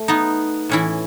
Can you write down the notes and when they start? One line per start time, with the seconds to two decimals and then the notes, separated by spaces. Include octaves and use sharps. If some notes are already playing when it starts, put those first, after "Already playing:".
Already playing: A3
0.08 B3 D#4
0.69 A2 E3 C#4 E4